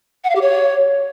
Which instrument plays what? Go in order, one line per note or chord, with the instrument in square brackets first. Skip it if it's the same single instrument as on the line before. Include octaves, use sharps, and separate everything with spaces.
[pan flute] F#5
F5
G4
C#5